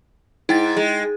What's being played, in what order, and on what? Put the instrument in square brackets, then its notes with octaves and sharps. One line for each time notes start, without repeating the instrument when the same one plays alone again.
[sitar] G#2 [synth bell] E4 G5 A6
[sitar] G#3